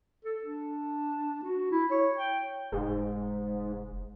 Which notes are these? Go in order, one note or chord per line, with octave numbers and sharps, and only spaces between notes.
A4
D4
F#4
E4
C#5
G5
F1 G#2